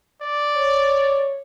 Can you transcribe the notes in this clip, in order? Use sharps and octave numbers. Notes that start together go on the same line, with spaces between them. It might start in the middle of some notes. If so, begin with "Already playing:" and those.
D5
C#5